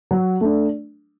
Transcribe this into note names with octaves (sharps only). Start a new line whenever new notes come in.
F#3
A3 D4